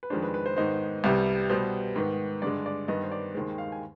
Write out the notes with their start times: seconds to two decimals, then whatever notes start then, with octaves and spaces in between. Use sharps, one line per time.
0.03 B4
0.10 F2 D#3 G#3 D4 C5
0.22 B4
0.34 B4
0.46 C5
0.57 G#2 D#3 B3 D#4 C5
1.04 C2 C3 G3 B3
1.49 B2 G3 B3 C5
1.96 G#2 D#3 B3
2.42 G2 D3 G#3 D5
2.66 D5
2.88 G2 D#3 B3 D#5
3.04 C5
3.12 D5
3.34 D#2 D#3 G#3 C5
3.58 F5
3.72 G#5